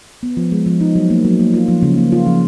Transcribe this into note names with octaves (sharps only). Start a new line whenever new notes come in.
B3
F3
G#3
F3
D#4
F#3
A#3
F#3
A#3
F4
F3
C#3
A#3
F4
F3